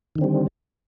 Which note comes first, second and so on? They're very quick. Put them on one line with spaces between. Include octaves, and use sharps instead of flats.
D#3 D3 C4 G3